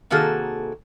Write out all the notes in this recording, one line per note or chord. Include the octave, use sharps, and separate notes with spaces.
C3 D#3 A#3 F#4 G#4 A4